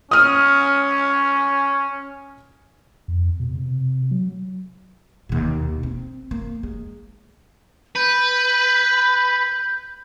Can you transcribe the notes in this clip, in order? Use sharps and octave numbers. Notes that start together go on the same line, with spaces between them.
C#4 D#6 F6 D#7
F2
B2
C3
F#3
D#2 B2
C4
A#3
G#3
B4 G6